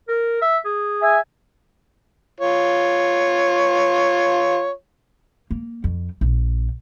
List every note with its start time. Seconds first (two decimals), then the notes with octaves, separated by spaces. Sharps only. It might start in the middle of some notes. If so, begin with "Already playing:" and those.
0.08 A#4
0.42 E5
0.65 G#4
1.02 E5 G#5
2.40 F4 C#5
5.51 A#3
5.84 F2
6.21 A#1